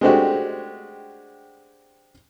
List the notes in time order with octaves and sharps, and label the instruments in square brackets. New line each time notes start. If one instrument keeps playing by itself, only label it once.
[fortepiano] G#3 A3 C4 D4 F#4 G4